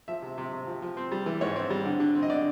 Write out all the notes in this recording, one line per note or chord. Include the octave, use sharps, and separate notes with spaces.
F3 E5
C3
C3
C3
F3
F3
C4 C5
G3
E3
G#2 C#5
C4
G3
D3
D3
C4
D#5
D3 D5